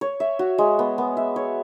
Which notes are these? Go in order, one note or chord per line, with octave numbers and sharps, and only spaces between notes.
C#5
E5
F#4
G#3
B3
B3
E5
C#5